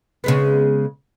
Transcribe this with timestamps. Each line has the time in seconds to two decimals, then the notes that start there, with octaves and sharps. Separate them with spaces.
0.24 C#3 G#3 B3